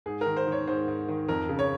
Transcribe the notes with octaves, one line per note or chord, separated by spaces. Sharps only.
G#2 G#4
D#3 A#4
C5
D#3 C#5
G#2 C5
G#2
D#3
F2 A#4
C#3
C#5